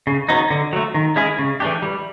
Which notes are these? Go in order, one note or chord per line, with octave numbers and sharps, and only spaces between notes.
C#3
F#3 B3 D#4
D3
F#3 A3
D#3
G#3 C#4 E4 G#4
C#3
E3 A3 D4 G4
G3